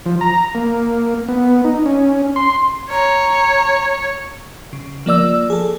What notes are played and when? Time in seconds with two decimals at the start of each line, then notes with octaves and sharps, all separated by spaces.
0.06 F3
0.21 A#5
0.55 A#3
1.28 B3
1.65 D#4
1.86 C#4
2.36 C6
2.91 C#5 A#5
4.73 C#3
5.06 F3 A#3 D5 E6
5.50 G#4 A4